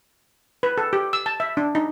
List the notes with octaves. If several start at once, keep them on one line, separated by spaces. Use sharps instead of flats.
B4
A4
G4
E6
A5
E5
D4
D#4